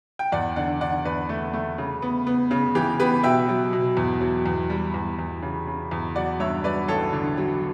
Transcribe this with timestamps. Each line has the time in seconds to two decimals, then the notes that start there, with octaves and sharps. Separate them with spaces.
0.19 G5
0.32 E2 D5 F#5
0.56 D3 D5 F#5
0.81 D3 D5 F#5
1.05 E2 B4 D5
1.29 A3
1.54 A3
1.78 C#3
2.02 B3
2.27 B3
2.51 C#3
2.75 E3 G4
3.00 B3 G4 B4
3.23 B2 E5 G5
3.49 F#3
3.73 B2
3.97 E2
4.21 F#3
4.46 E2
4.70 G3
4.94 E2
5.19 E2
5.42 C#3
5.67 C#3
5.91 E2
6.15 F#3 D5 F#5
6.40 G2 C#5 E5
6.64 F#3 B4 D5
6.88 A1 A4 C#5
7.13 D3
7.37 F#3